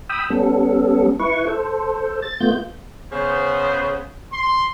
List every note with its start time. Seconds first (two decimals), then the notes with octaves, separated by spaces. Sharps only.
0.09 G5 B5 D#6 E6
0.30 G3 B3 C#4 A4
1.19 E4 B4 C#6
1.47 A4 C5
2.22 A6
2.40 A3 B3 F4 G6
3.12 C#3 B3 C5
4.32 C6